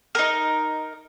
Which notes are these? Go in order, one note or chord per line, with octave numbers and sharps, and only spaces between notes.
D#4 A#4